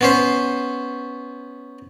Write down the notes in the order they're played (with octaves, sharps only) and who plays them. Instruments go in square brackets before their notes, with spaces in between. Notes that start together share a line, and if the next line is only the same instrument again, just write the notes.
[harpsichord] B3 C#4 C5